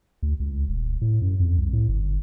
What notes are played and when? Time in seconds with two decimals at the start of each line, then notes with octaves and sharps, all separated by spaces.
0.23 D2
0.40 C#2
0.68 D#1
1.02 A2
1.22 F#2
1.40 F2
1.58 C2
1.73 A2
1.89 G1